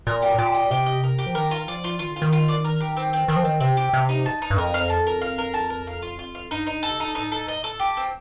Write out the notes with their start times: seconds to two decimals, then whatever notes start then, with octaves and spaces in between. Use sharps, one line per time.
0.07 A#2 A#4
0.22 G4
0.38 A#2 G4
0.54 D#5
0.71 C3 G4
0.86 D#5
1.04 A#4
1.19 G4
1.26 F3
1.35 D#3 A#4
1.51 F4
1.67 F3 D5
1.84 F4
1.99 D#3 F4
2.11 D3
2.16 F4
2.22 D#3
2.32 F4
2.48 D5
2.65 A#4
2.81 G4
2.97 C4
3.13 C4
3.28 D#3 C4
3.36 F3
3.44 D#3 C4
3.60 C3 C4
3.77 G4
3.93 C3 F5
4.09 D#4
4.26 A5
4.42 D#4
4.50 G2
4.57 F2 A#4
4.74 F5
4.90 A5
5.07 A#4
5.22 F5
5.38 A#4
5.54 A5
5.70 A#4
5.87 F5
6.02 F4
6.19 F4
6.35 F5
6.51 G2 D#4
6.67 D#4
6.83 A4
6.90 C3
7.00 A#2 D#4
7.15 A2 D#4
7.32 A4
7.48 D#5
7.64 A4
7.79 A#2 G4
7.97 C4